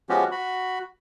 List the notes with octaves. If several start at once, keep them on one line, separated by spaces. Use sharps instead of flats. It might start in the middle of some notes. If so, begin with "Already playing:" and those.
F3 G#3 B3 C#4 F#4 G4
F#4 B5